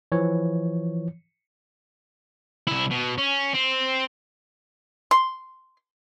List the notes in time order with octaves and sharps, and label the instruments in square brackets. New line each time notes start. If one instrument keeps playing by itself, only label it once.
[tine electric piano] E3 F3 C#5
[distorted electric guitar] C2 E4
B2
C#4
C4
[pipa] C6